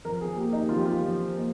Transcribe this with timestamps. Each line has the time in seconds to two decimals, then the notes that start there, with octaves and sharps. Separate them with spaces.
0.05 F3 A#4
0.21 G#4
0.37 A#3 G4
0.53 D#4
0.69 F3 F4
0.77 G4
0.85 F4
1.01 F3
1.33 A#3